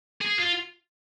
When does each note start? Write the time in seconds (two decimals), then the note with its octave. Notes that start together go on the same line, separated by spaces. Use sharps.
0.21 G#4
0.39 F4